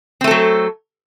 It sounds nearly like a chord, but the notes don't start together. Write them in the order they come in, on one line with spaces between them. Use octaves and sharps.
C4 A3 A4 F#3